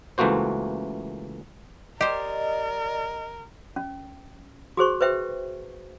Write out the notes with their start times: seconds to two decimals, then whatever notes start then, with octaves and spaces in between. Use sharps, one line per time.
0.18 C#2 E3 A3 A#3 F#4 C5
2.01 G4 A#4 C5 D5 D#5
3.76 C#4
4.77 F#4 G#4 C5 C#6
5.01 B4 C5 E5 G5